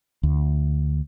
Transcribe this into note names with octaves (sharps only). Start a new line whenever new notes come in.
D2